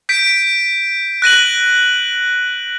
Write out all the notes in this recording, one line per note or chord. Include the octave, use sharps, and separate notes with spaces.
G6 B6 D7
F#6 A#6 D#7 F#7